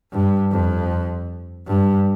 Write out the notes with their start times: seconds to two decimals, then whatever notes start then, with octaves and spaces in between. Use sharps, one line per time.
0.13 G2
0.51 F2
1.67 G2